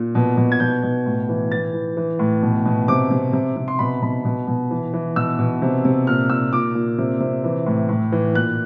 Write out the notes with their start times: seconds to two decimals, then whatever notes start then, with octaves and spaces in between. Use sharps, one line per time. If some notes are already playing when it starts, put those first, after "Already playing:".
Already playing: A#2
0.15 B2
0.37 B2
0.52 G#6
0.60 B2 G6
0.83 B2
1.06 A2
1.29 E3
1.52 E3 A6
1.74 E3
1.97 E3
2.19 A2
2.43 B2
2.65 B2
2.88 C3 D6
3.11 C3
3.33 C3
3.56 C3
3.68 C6
3.79 B2 B5
4.02 B2 B5
4.25 B2
4.47 B2
4.71 E3
4.94 E3
5.16 B2 E6
5.39 B2
5.62 C3
5.85 C3
6.07 A#2 F6
6.30 A#2 E6
6.53 A#2 D6
6.75 A#2
6.98 C3
7.20 C3
7.44 E3
7.66 A2
7.89 A2
8.12 E3
8.35 A#2 F#6